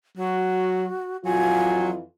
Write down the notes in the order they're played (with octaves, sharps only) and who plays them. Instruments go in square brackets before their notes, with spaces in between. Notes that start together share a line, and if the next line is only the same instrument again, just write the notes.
[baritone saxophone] F#3 [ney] F#4
[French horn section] F2 E3 F4 [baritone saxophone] F#3 [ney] G#5